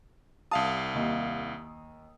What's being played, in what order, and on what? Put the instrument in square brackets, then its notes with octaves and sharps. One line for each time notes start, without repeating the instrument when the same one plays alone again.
[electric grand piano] C2 F5 D#6 [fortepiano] A5
[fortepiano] D#2